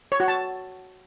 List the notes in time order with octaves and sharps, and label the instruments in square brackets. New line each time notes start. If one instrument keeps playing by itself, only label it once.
[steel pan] C#5
F#4
A5